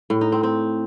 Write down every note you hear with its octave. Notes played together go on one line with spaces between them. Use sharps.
A2
D#4
C4
C4